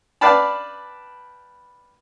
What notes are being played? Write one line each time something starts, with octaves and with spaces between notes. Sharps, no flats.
B4 D5 F5 G5 A5 B5